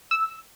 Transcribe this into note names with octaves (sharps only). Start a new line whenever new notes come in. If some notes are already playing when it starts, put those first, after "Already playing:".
E6